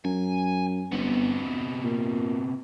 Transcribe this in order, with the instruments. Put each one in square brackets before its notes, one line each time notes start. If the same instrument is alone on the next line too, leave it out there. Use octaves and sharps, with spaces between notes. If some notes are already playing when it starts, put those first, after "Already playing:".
[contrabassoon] F#2 [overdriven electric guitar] G#5
[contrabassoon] G1 [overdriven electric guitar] C3 B3
[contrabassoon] A#2